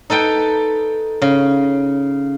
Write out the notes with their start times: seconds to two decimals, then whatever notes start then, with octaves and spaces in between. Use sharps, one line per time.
0.10 D#4 A4 B4 G5
1.22 C#3